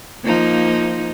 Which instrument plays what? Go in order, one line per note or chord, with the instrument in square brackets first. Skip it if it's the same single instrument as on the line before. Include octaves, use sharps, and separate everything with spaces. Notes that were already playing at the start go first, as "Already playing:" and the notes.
[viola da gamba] F3 A#3 D#4